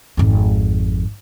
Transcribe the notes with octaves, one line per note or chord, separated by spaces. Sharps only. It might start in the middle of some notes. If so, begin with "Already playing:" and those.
G#1 F2